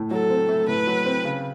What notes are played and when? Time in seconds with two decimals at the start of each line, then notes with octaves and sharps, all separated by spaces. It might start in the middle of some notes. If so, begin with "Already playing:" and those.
Already playing: A2 A3
0.11 F#3 A4
0.30 C4
0.49 A3
0.68 A2 B4
0.87 F#3
1.06 C4
1.24 C#3